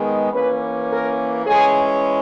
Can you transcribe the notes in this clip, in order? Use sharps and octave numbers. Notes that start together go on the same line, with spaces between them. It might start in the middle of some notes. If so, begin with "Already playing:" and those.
Already playing: D#3 G#3 B3
E3 A#3 C#4 B4
A#4
E3 G#3 C#4 G#4